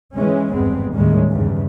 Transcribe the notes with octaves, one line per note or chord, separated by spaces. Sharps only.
E3 G#3 C#4
G#1 E2 G2 G#3 B3 C4
D#2 A2 D#3 G3 G#3 C#4
E2 G2 C#3